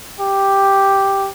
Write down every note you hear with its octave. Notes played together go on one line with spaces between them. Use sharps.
G4